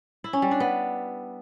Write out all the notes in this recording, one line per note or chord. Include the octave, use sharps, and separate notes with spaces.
E4
C#4
G3
D4
B3